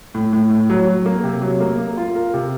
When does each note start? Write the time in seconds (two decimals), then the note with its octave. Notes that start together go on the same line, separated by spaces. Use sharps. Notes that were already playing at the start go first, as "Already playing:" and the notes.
0.14 A2
0.33 A2
0.50 A2
0.70 F#3
0.87 F#3
1.06 A#3
1.24 C3
1.42 F#3
1.60 A#3
1.79 A#3
1.97 F4
2.15 A#4
2.34 C3